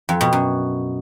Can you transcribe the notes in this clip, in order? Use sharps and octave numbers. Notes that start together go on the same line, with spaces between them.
F2
B2
F#2